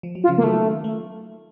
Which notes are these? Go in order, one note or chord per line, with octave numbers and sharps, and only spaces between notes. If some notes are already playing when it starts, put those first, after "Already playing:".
F3
F#3
F4
C#3 F3
A#3
D#3 F#3 A3
A3